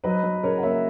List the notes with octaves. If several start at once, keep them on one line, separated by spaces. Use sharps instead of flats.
F#3 B4 D#5
F#3
C#3 A#4 C#5
F#5
A#3 C#5 E5